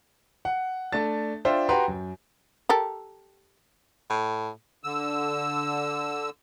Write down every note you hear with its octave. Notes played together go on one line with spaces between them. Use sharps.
F#5
A3 D4 A5 A6
D4 F4 C5 E5 G5
F#4 G4 B4 G5 A#5 C6
F#2
G4 A4 A#4
A2
D3 E6